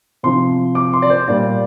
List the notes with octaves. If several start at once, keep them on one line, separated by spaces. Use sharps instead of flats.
C3 F3 C6
D6
C6
D5
C5
A#2 G3 D5